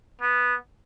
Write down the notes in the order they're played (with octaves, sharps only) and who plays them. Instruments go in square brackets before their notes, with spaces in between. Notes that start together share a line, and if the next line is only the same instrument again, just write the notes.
[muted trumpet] B3